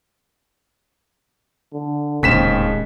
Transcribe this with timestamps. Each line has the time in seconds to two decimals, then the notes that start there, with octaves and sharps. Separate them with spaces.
1.73 D3
2.23 D1 D#2 A#2 C#3 G#3 C4 B6 E7